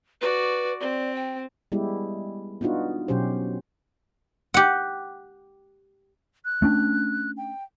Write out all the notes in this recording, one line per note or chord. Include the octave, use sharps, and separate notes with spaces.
F#4 B4 D5
C4 D5
G5
G3 G#3 B3 E4 G4
B3 D4 D#4 F4 F#4
B2 F#3 C#4 G4 C5
G4 F#5
F#6
A3 C#4 D4
G5